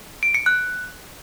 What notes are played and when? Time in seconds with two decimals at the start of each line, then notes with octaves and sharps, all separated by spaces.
0.23 D7
0.34 C#7
0.46 F#6